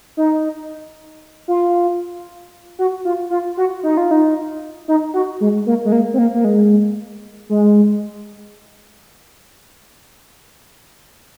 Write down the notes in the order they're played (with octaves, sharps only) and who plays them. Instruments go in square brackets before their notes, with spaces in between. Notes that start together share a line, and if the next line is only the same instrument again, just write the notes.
[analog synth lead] D#4
F4
F#4
F4
F4
F#4
D#4
F4
D#4
D#4
F#4
G#3
A#3
G#3
A#3
C4
A#3
A#3
G#3
G#3